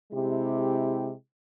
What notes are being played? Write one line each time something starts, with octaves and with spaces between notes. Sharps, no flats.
C3 G#3 E4 G4